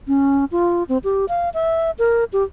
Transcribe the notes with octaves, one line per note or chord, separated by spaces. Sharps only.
C#4
F4
C4
G4
F5
E5
A#4
G4